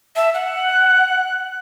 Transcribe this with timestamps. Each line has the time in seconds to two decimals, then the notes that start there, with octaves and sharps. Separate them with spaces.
0.16 E5 A5
0.34 F#5 F#6